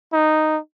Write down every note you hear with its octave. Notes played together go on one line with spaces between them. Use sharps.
D#4